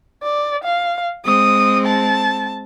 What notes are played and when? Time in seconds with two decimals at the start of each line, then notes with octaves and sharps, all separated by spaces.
0.23 D5
0.63 F5
1.25 G#3 C4 D#6
1.86 A5